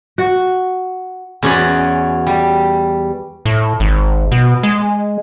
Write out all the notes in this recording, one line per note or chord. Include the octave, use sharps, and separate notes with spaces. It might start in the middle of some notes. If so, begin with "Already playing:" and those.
F#4
E2 C#4 F#4 D5 B5
G3
A2
G#1
B2
G#3